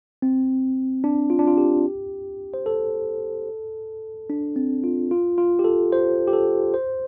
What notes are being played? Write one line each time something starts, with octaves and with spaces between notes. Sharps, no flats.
C4
D4
F4
D4
F4
G4
C5
A4
D4
C4
F4
F4
F4
G4
A4
C5
G4
A4
C5